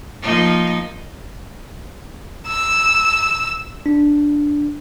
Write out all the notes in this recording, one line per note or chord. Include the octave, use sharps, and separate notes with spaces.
F3 A#3 D#4
E6
D4